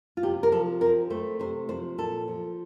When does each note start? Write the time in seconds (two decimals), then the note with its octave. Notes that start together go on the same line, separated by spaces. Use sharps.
0.17 F4
0.23 C3 G4
0.43 A#4
0.52 F3 A4
0.81 C4 A#4
1.10 A3 C5
1.39 C3 C5
1.69 F3 C5
1.98 A#2 A4
2.28 F3